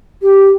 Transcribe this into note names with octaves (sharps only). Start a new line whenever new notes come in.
G4